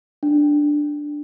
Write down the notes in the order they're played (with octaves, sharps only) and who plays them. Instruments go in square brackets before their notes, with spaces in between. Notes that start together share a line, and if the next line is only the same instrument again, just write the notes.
[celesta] D4